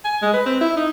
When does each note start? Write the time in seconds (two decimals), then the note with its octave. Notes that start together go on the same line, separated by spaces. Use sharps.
0.05 G#5
0.22 G#3
0.34 B4
0.46 C4
0.61 E4
0.77 D#4